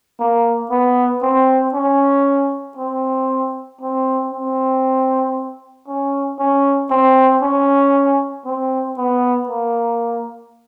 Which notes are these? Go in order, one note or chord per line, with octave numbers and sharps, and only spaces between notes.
A#3
B3
C4
C#4
C4
C4
C4
C#4
C#4
C4
C#4
C4
B3
A#3